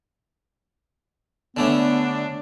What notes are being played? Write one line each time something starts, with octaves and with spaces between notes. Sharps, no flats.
D3 A3 B3 C#4 D4